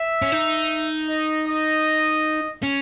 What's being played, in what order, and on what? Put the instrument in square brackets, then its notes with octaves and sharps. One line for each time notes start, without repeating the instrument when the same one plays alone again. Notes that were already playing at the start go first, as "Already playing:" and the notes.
Already playing: [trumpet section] E5
[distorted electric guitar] C#4
D#4
[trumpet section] D#5
D#5
[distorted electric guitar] C#4